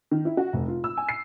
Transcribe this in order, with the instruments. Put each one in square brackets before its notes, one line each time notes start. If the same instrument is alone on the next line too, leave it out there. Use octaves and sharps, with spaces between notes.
[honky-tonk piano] D#3
E4
F#4
F1
F4
E6
G#5
C7